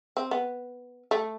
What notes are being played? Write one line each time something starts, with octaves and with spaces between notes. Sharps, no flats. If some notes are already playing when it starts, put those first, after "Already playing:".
C4
B3
A3